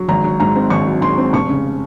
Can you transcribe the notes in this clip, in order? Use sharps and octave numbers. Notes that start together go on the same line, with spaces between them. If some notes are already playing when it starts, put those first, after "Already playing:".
Already playing: F#3
G#1 A#5
F#3
G#2 A#5
C4
G#1 C#6
F#3
G#2 C6
C4
F1 C#6
C#3